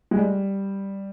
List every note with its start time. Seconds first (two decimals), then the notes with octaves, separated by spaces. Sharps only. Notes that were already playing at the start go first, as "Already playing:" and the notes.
0.11 G#3
0.17 G3